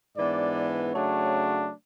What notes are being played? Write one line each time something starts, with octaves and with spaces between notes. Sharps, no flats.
G#2 E3 B3 D4 D5
C#3 F#3 A3 D4 C#5